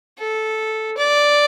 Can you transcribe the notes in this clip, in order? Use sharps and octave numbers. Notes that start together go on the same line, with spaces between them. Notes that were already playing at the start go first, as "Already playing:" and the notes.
A4
D5